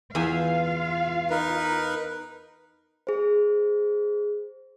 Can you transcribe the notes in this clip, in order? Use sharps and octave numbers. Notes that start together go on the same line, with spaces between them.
E2 F4 E5 F5 G#5
D#4 A#4 B4
G#4 C5